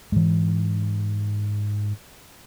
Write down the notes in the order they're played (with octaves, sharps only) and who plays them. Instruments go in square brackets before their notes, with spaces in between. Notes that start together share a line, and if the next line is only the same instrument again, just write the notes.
[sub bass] G#2 [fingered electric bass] E3 G#3